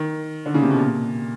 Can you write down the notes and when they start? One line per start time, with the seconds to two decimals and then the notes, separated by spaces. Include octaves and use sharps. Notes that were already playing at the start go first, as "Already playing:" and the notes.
Already playing: D#3
0.46 D3
0.54 C#3
0.62 C3
0.70 B2
0.79 A#2